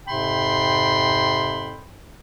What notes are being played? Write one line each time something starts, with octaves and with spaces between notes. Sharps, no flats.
F2 G#2 C3 G5 B5 C6